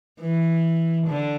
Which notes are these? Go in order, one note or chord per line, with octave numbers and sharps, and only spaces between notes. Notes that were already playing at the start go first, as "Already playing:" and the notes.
E3
D3